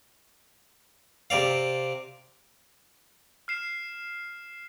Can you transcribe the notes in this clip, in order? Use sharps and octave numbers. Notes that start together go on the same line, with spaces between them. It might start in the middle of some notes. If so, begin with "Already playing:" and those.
C3 C4 D5 F5
F6 C7 E7